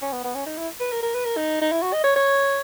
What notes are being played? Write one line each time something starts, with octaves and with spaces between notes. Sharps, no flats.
C#4
B3
B3
C#4
D#4
E4
B4
A#4
A#4
B4
A#4
D#4
D#4
E4
F#4
D#5
C#5
C#5